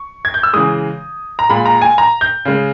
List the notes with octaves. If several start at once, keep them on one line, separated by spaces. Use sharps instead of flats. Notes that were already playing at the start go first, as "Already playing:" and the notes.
Already playing: C#6
G#6
G6
E6
C#3 E3 G#3 D#6
A#5
A#2 G#3 B5
A#5
G#5
A#5
G6
C#3 G#3